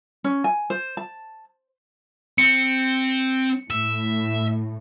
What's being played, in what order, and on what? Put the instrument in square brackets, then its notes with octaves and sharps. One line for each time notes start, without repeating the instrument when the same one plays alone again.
[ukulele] C#4
G#5
C5
A5
[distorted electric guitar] C4 [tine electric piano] C#7
[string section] A2 [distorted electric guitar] E5